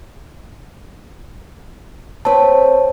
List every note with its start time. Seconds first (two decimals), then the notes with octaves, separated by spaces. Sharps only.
2.25 C4 B4 C#5 A5